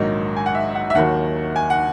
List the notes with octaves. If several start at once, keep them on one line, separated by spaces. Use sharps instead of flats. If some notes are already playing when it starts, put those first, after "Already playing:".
Already playing: A#1 G#2 D#3 F#3 D#5
G#5
F#5
E5
F#5
E5
D#2 D#3 F#3 F#5
G#5
F#5